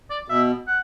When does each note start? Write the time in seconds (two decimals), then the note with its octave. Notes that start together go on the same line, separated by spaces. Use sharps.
0.10 D5
0.28 B2 E5
0.67 F#5